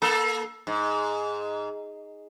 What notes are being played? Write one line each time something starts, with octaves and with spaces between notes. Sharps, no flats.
A#3 A4
G#2